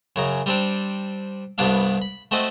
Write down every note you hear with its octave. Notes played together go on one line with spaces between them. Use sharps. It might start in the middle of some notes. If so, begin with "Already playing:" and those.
F#2 C#3 A#5
G3 C4 D4
C2 G2 B3 D4 F5
B5
A3 C4 F#4 D#5 A5